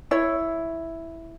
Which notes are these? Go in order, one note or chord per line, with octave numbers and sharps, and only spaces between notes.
E4 C#5